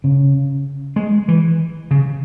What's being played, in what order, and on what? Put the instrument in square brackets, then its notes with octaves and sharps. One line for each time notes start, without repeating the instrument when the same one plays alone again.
[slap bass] C#3
G#3
E3
C#3